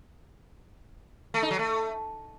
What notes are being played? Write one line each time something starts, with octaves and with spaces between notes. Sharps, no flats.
A3
D#4
F#3
A3